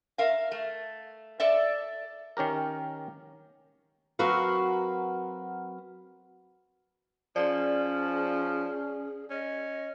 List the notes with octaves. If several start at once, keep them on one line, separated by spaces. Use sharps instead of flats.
A#4 E5 F5
A3
A4 D5 E5
D#3 C#4 G4 A#4
F#3 C4 F#4 A#4 B4 F5
F3 C#4 G#4 D5
C#4 D#5